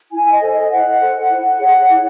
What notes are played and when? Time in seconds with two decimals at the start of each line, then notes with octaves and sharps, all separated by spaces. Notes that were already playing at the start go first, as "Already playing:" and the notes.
0.12 E4 G#5
0.31 D#5
0.41 A4 C5
0.51 D#5
0.71 E4 F#5
1.00 A4 C5
1.30 E4
1.59 G#4 C#5
1.89 E4